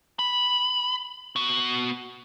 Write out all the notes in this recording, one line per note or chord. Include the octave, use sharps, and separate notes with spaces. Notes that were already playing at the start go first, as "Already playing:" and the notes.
B5
B3 F#4